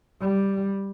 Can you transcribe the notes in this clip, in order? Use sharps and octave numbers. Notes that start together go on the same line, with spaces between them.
G3